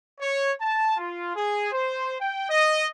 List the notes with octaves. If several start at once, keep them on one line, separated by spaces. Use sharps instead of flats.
C#5
A5
F4
G#4
C5
G5
D#5